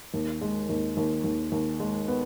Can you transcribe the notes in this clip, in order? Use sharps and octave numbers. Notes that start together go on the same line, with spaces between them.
D#2
G#3
D#2
D#2
D#2
D#2
G#3
B3